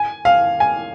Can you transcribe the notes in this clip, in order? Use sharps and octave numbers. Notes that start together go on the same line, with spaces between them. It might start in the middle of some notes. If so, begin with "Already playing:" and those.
Already playing: G#5
F5
G#5